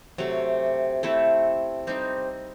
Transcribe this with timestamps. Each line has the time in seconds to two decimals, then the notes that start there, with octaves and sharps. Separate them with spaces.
0.18 C3 F#3 A3
1.03 A3 C4 E4 A4
1.87 G3 C4 D#4